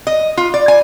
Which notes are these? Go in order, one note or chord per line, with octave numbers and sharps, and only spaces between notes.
D#5
F4
D5
G#5